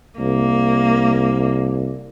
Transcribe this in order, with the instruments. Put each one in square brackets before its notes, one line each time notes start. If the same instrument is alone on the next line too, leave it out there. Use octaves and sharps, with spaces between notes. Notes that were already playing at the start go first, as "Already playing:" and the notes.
[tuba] C2 [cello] A#3